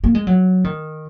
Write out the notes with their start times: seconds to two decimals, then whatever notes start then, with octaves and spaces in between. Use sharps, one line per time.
0.04 A#3
0.15 G#3
0.27 F#3
0.64 D#3